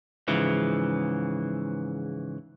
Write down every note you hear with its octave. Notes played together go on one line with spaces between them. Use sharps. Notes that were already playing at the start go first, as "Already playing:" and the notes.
G#2 C#3 E3 F3